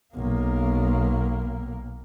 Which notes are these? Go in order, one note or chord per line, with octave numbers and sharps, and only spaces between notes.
B1 A#3